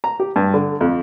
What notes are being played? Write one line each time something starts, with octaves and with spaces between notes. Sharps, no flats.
A#5
G4
G2
D3
F2